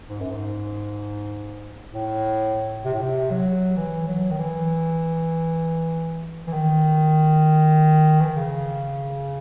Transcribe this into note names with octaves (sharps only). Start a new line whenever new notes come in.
G#2
F#2
G#2
A2
C3
A2
C3
F#3
E3
F#3
D#3
E3
E3
D#3
E3
D#3
C#3